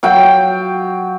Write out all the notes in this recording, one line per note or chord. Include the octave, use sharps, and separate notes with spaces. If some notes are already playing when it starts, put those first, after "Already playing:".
F#3 F5 G5